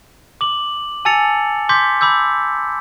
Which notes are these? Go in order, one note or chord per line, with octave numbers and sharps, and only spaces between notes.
D6 F#7
G#5 A5 E6 A6 C#7 F7
C6 D6 G6 B6
B5 D6 E6 G6